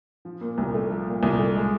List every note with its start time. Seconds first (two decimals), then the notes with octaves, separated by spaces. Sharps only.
0.25 F3
0.41 A#2
0.58 C2
0.74 A3
0.90 F3
1.07 A#2
1.23 C2
1.39 A3
1.55 G#3